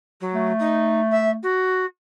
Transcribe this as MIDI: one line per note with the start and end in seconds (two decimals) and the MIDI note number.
0.21 0.52 54
0.34 1.39 57
0.59 1.00 63
1.11 1.31 76
1.43 1.85 66